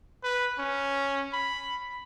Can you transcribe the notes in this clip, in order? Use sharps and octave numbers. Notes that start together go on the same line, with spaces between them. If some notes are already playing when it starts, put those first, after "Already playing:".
B4
C#4
B5